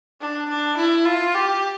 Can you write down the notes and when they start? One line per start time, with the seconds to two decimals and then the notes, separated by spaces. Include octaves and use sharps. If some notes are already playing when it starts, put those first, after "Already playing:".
0.21 D4
0.49 D4
0.77 E4
1.06 F4
1.35 G4